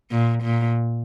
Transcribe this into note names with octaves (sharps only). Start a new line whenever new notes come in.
A#2
A#2